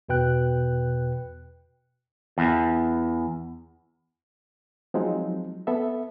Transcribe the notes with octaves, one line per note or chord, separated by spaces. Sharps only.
E2 B2 B4 G5 F#6
E2
F3 F#3 G#3 C4 D#4
B3 A4 E5